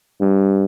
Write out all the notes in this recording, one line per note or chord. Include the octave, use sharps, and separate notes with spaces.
G2